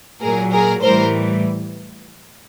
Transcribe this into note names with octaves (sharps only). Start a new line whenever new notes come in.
A#2 F#3 G#4 A#4
G#4 A#4
A2 E3 G3 A#4 C5